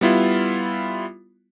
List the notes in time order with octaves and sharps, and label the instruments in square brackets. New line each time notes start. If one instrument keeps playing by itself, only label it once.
[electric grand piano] G3 B3 E4 F4